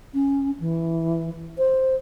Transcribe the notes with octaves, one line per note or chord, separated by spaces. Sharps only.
C#4
E3
C5